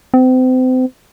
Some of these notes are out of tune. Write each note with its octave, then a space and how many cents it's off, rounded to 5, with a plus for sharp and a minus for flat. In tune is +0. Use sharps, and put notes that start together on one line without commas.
C4 -35